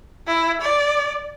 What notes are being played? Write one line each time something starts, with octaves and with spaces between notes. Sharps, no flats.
E4
D5